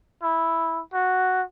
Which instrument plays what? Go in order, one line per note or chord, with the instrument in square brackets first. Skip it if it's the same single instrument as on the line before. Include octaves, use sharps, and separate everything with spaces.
[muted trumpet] E4
F#4